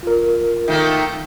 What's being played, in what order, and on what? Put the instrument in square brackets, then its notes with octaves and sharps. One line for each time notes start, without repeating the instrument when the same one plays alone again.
[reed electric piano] F4 A#4
[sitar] D#3 A3 A#3